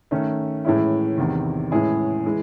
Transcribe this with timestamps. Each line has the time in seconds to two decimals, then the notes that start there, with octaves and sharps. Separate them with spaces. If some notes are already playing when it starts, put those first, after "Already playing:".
0.11 D#3 A3 C#4
0.65 A2 E3 G#3 C#4 E4
1.17 E2 C3 D#3
1.71 A2 E3 G#3 C#4 E4 G#4
2.26 E3 G#3